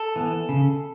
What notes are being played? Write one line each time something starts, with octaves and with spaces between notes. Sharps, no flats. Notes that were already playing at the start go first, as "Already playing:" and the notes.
Already playing: A4
E3 B3
C#3